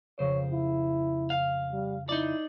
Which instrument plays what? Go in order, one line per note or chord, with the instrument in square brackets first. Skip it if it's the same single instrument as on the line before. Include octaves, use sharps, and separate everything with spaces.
[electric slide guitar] F2 C#3 C5 [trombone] C#5
[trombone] E4
[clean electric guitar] F5
[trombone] G3
[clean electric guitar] D#4 D5 [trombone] E4